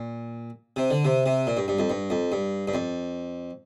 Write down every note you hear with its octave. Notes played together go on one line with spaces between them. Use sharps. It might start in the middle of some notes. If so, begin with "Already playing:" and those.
Already playing: A#2
C3
D3
C3
C3
A#2
G2
G2
F2
G2
F2
G2
G2
F2